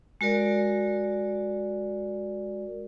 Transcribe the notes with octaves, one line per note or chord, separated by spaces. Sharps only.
G#3 F#4 A#4 D5